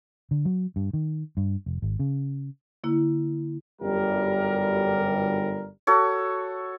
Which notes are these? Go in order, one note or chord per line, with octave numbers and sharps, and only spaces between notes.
D3
F#3
G2
D#3
G2
F1
G#1
C#3
D3 A#3 E4
G1 F#2 G3 A#4
F#4 A4 C#5